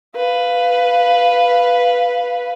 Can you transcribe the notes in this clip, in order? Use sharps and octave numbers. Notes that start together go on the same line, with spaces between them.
B4 F5